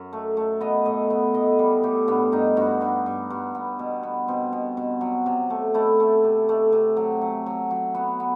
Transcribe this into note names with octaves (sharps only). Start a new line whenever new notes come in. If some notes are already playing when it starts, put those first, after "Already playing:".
Already playing: F#2 E5
A3
A3
B3 D#5
A2 D#5
B3
A2 D#5
G3
A2 G4
G2 B3
G2 D#4
G2 F#4
G2 B3
G2
G2
B3
B2
B3
B2 C4
B2
B2
F#3
C3
A3
A3 E4
A3
C3
A3
C3
F#3
F#3
F#3
F#3
B3 F#4
B3